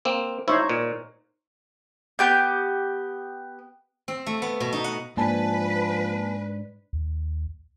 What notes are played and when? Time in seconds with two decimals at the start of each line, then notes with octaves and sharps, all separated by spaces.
0.05 A#3 C4
0.48 D#4 E4 C5 C#5
0.69 A#2
2.19 B3 G4 G6
4.08 C4
4.26 A3
4.42 B3
4.60 B2
4.73 D#4
4.84 F#5
5.17 G#2 F3 A#3 D4 B4 G#5 A5
6.93 D#2